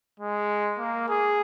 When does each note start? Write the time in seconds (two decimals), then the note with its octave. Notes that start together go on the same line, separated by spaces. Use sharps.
0.20 G#3
0.79 A#3
1.09 G#4